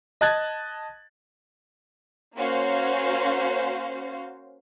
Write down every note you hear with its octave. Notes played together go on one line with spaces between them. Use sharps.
D#5 A5 F#6 G#6 A6
A#3 C#4 F#4 C5 F5